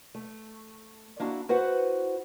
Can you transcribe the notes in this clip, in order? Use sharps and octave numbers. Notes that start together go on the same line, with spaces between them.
A3
A#3 D4 E4 F#4
E4 F#4 B4 C5 F#5